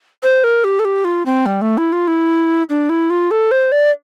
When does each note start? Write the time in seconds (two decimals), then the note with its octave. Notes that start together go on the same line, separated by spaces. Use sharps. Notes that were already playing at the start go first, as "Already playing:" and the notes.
0.23 C5
0.44 A#4
0.64 G4
0.79 A4
0.85 G4
1.05 F4
1.26 C4
1.46 G3
1.61 A3
1.78 E4
1.92 F4
2.08 E4
2.69 D4
2.89 E4
3.10 F4
3.31 A4
3.51 C5
3.72 D5